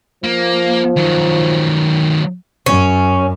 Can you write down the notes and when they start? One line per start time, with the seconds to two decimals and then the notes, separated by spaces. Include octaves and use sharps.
0.24 F3 A#3
0.96 D#3 F#3
2.66 F#2 C#4